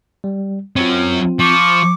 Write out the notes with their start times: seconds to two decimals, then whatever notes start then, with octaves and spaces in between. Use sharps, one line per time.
0.24 G3
0.76 F#3 C4 C#4 F4
1.40 F3 C#6 D6